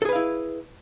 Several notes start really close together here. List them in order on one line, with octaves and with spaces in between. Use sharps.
A4 G#4 B4 F5 E4